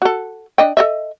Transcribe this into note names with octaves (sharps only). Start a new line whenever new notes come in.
F#4 A4
D4 D#5 G5
A4 D#5 E5